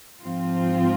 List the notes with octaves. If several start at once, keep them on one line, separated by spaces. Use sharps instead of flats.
G#2 F3 C4 F4